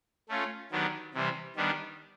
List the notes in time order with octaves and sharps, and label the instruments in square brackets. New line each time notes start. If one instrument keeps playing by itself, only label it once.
[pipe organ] A3 C#4 F4
D#3 F#3 B3 D4 G4
C3 E3 G3 C4
D#3 G3 B3 D4